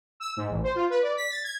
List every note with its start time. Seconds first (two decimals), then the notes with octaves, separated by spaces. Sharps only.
0.20 E6
0.37 G#2
0.50 A1
0.63 C5
0.75 F4
0.90 B4
1.02 D5
1.17 B6
1.30 A6
1.43 G#6